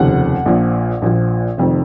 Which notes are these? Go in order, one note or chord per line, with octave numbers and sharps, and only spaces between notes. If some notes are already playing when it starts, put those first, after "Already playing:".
Already playing: F1 D#2 C#3 F3 F#5
A#1 A#2 F3
A#1 A#2 F3
F1 F2 D#3